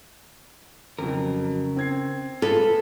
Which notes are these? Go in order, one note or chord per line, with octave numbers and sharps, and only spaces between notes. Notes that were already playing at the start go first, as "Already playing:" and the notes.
F2 C#3 F#3 A#4
C4 G#6 C7
F4 G#4 A4 B4